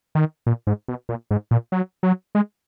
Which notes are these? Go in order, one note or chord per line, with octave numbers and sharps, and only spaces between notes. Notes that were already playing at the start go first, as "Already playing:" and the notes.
D#3
A#2
G#2
B2
A#2
G#2
A#2
F#3
F#3
G#3